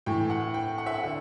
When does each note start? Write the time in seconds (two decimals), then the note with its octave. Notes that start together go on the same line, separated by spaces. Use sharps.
0.06 A2 E3 G5
0.30 F#5
0.54 G5
0.78 F#5
0.86 E5
0.94 F#5
1.03 D3